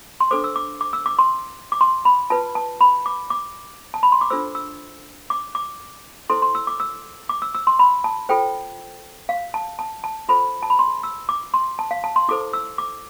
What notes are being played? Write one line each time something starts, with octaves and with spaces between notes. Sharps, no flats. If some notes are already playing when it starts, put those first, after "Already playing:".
C6
D4 A4 C5 D6
E6
D6
D6
E6
D6
C6
D6
C6
B5
F4 B4 A5
A5
B5
D6
D6
A5
B5
C6
D6
D4 F4 A4 C5 E6
E6
D6
D6
E4 A4 C5 C6
C6
E6
D6
E6
D6
E6
E6
C6
B5
A5
F4 A4 C5 G5
F5
A5
A5
A5
F4 A4 C5 B5
A5
B5
C6
E6
D6
C6
A5
F5
A5
C6
E4 A4 C5 D6
E6
D6